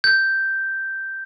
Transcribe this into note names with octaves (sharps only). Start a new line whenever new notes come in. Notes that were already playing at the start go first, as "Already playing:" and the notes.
G6